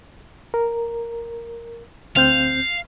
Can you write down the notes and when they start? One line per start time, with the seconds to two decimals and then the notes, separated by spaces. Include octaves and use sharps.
0.54 A#4
2.16 D2 C4 F5 G6